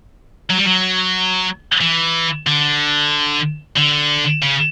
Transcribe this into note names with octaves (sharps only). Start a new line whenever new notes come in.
F#3
G3
F#3
E3
D3
D3
C#3